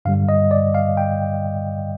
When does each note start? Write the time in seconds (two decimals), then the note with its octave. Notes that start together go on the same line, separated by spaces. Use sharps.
0.05 G2 D3 G3 F5
0.29 D#5
0.51 D5
0.74 F5
0.97 G5